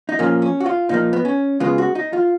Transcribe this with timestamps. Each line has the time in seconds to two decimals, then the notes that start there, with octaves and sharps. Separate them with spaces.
0.09 D#4
0.19 A#2 F3 A#3 C#4
0.42 C#4
0.60 F#4
0.66 F4
0.89 A#2 F3 A#3 D#4
1.13 B3
1.25 C#4
1.60 C#3 G#3 B3 F4
1.78 F#4
1.95 D#4
2.13 F4